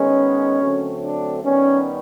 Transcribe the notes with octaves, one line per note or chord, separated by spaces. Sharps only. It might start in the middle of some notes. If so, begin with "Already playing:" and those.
Already playing: D#3 G#3 B3 C#4
D3 F#3 A3 C4
D4
D#3 G3 B3 C#4